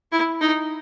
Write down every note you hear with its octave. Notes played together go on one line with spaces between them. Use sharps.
E4
D#4